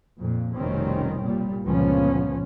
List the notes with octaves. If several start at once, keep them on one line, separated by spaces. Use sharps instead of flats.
F2 A#2
F1 B1 D#3 G3 C4 C#4
A#2 G3
G1 C#2 A#2 F3 B3 C#4